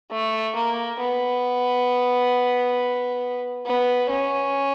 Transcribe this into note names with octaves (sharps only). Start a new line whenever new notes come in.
A3
A#3
B3
B3
C#4